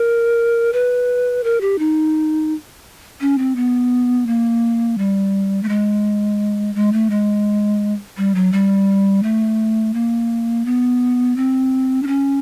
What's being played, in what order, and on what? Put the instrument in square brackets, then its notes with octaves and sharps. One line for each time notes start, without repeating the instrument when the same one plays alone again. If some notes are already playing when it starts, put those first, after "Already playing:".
Already playing: [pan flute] A#4
B4
A#4
G4
D#4
C#4
C4
B3
A#3
G3
A3
G#3
G#3
A3
G#3
G3
F#3
G3
A3
A#3
B3
C4
D4
C#4